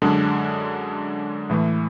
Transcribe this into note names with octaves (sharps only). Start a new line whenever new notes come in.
F#2 D3 G#3 D4
A2 E3 A3